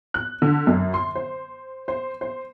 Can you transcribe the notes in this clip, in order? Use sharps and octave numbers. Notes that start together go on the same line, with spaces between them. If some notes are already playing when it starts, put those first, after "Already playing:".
F#6
D3
F#2
C6
C5
C5
C5